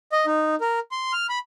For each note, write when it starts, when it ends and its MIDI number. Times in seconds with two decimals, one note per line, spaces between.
0.12 0.25 75
0.26 0.55 63
0.61 0.79 70
0.91 1.12 84
1.13 1.27 89
1.29 1.39 83